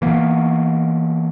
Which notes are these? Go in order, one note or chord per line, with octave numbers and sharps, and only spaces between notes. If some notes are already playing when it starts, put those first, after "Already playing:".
E3 A#3 B3